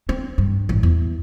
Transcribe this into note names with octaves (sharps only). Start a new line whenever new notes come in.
C4
G2
A1
E2